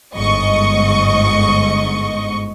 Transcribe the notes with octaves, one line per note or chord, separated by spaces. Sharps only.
G1 G#2 D#5 C#6